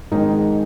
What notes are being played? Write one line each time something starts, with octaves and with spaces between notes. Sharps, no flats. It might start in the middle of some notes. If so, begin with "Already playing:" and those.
F2 G#2 D#3 G#3 D#4 A#4